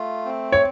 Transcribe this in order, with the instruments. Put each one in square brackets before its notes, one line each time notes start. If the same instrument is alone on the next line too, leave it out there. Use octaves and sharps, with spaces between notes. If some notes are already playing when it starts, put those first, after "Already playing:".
Already playing: [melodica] A3 F4
C4
[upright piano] C#5